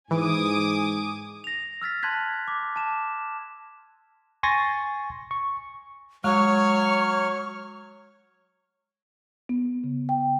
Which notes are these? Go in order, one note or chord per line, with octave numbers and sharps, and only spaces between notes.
G#2 E3 G#5 D6 D#6
A#6 F7
E6 F6 A6 B6
A5 C6 F#6 G#6 B6
D6
A5 E7
G#5 C6 C#6 A6 A#6
C#6
F#3 G#3 C#5 C#6 F6
B3
C#3
G5